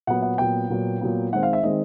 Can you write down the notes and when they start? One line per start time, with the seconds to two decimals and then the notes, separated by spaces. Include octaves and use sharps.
0.07 A#2 F#3 B3 F#5
0.22 F#5
0.38 A#2 F#3 B3 G5
0.70 A#2 F#3 B3
1.01 A#2 F#3 B3
1.32 D#3 G#3 C4 F#5
1.43 F5
1.53 E5
1.63 D#3 G#3 C4 D#5